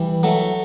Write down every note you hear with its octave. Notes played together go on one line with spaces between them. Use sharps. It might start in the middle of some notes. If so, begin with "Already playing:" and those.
Already playing: E3 G3
F#3 A3